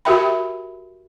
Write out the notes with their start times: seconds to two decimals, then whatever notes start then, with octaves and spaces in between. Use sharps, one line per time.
0.05 F#4 G4 A#4 E5 G5 B5